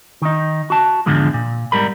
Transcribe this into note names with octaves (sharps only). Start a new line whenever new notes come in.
D#3 D#4
F#4 A5
E2 G#2 D3 F3 G#3
A#2
G#2 G3 A#4 B5